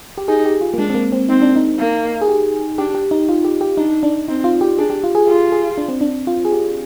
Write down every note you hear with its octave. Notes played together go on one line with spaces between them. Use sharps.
G4
D#4 G#4
G4
F4
A#3
G#3 D4
C4
A#3
C4
C4 D#4
D4
D#4
A#3
G#4
G4
D4 G4
G4
D#4
F4
G4
G4
D4 D#4
D4
C4 D#4
F4
G4
D4 G#4
G4
F4
G#4
F4 G4
G#4
D4
C4
D4
F4
G#4
G4